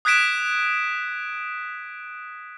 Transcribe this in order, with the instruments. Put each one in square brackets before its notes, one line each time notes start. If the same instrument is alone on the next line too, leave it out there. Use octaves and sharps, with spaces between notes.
[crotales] D#6 F#6 G#6 B6 D7 E7